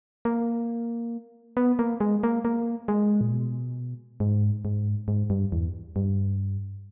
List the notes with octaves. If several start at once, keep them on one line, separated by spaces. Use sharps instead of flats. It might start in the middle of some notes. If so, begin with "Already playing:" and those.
A#3
B3
A#3
G#3
A#3
A#3
G#3
A#2
B2
G#2
G#2
G#2
G2
E2
G2